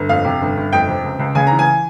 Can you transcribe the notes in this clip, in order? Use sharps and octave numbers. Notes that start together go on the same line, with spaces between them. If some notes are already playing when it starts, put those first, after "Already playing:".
Already playing: G1
F2 F5
C3
G1
G1
F2 G5
C3
C#2
C#2
C#3 G#5
E3 A#5
G#5